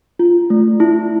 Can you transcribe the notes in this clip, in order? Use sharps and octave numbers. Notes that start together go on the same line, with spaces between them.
F4
A3
E4